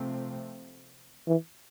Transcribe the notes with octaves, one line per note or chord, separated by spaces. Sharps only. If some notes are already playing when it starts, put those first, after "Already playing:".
Already playing: C3 F3 A3 C4
E3